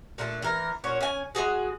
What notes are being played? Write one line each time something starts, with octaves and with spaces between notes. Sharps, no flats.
A#2 D3 A3 A4
E3 A#4
A#2 C#4 F#4 C#5
C#4 G#5
G#3 A#3 F#4 G#4